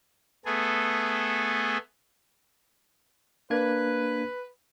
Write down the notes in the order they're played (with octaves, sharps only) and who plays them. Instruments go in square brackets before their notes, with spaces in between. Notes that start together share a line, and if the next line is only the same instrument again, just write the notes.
[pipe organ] A3 B3 G#4 A4
[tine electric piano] A#3 D4 G#6 [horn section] B4